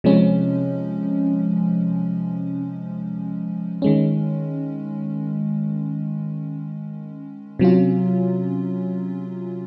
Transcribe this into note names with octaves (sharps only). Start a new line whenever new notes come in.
C3 F3 G#3 C#4
D#3 G#3 C#4
C3 F#3 C#4 F4